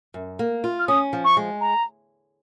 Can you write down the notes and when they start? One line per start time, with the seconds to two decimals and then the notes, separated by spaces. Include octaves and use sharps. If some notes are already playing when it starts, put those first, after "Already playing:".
0.14 F#2
0.39 A#3
0.64 F4
0.79 F6
0.88 C#4 D#6
1.13 F3
1.25 C#6
1.37 G#3
1.61 A#5